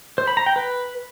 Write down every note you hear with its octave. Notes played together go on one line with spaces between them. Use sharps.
C5
B5
A#5
G5
B4